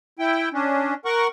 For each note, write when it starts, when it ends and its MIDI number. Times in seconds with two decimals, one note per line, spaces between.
0.19 0.49 64
0.19 0.49 79
0.53 0.94 61
0.53 0.94 62
1.05 1.27 70
1.05 1.27 78
1.05 1.27 85